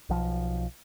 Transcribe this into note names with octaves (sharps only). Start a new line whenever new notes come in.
B1 F3